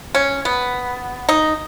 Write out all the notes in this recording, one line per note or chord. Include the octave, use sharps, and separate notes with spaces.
C#4
B3
D#4